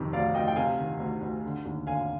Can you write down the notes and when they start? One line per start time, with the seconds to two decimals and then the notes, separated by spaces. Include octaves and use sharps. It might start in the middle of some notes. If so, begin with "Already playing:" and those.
Already playing: F2 C3 D#3
0.13 D2 D5 F5
0.34 D2 D#5 G5
0.48 G5
0.56 C3 F5 G#5
0.78 D#3
1.00 D2
1.21 D2
1.44 D3
1.65 D#2
1.86 D3 F5 G#5